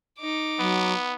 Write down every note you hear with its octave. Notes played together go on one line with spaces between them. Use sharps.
D#4 D6
F#3 B3